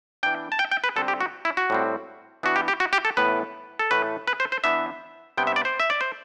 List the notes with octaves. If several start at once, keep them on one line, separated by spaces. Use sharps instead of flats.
E3 B3 D4 G5
A5
G5
G5
B4
D3 G3 C4 A4
G4
F#4
E4
F#4
A2 G3 C4
E3 B3 D4 F#4
G4
G4
F#4
G4
A4
A2 E3 B3 B4
A4
A2 E3 A3 B4
B4
C5
C5
E3 B3 D4 E5
C3 G3 B3 D4 G5
E5
D5
C5
E5
D5
C5